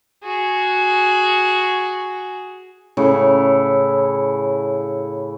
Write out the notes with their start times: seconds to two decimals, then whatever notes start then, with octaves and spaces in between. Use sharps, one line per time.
0.23 F#4 G#4
2.97 A2 C#3 E4 C#5